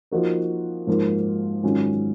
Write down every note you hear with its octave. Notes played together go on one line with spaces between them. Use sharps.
F3 A#3 D#4 F#4 A#4
G#2 F3 A#3
G#2 D#3 F#3 C#4 F4